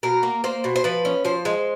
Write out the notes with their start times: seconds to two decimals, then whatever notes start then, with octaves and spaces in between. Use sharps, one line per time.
0.03 B2 A#4
0.23 A#3
0.44 A#3 C5
0.64 B2
0.76 C5
0.84 F3 B4
1.05 C#4
1.25 F3 C5
1.45 G#3